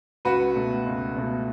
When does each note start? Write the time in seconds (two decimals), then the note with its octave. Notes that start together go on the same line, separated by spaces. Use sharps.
0.25 C#2 F#4 B4
0.55 B2 A3
0.86 C#2
1.16 B2 A3